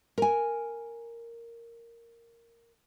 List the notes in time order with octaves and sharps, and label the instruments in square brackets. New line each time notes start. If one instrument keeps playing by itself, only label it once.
[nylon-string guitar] A#4 G#5